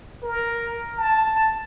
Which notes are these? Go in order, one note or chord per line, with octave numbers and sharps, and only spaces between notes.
A#4
A5